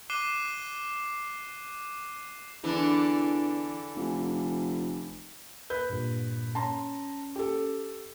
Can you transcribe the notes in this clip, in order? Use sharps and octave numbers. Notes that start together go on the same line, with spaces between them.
D6 F#6 C7 D#7 E7 G7
E2 D3 E3 D4
F1
B4 G6
G2 A#2
C#4 A5 A#5 C6
G4 A4